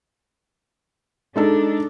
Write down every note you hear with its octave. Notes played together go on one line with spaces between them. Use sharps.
G#3 D4 D#4 A4